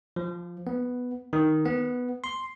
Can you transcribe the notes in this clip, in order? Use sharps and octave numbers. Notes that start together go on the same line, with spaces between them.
F3
B3
D#3
B3
C6